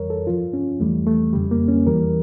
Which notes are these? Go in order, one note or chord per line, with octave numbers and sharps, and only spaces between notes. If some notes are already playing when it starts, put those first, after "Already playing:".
Already playing: F2 E3 G3 A#4 C#5
A4
G2 F3 F4
C#4
E2 E3 G3 A3
A3
F2 C#3 G3
A#3
C#4
E2 E3 G3 A#4